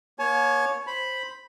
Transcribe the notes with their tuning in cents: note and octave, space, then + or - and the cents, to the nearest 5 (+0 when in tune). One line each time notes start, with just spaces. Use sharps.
A#3 +35 C#5 +0 G#5 +45
C5 +0 B5 +0